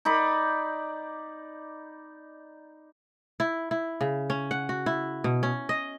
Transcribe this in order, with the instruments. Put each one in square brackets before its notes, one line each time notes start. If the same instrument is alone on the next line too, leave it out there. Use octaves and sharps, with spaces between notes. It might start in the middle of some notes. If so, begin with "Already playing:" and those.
[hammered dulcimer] D#4 D5 B5
[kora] E4
E4
C#3
C#4
F#5
F#4
E4
B2
C#4
D#5